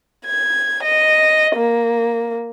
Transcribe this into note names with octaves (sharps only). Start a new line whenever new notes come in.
G#6
D#5
A#3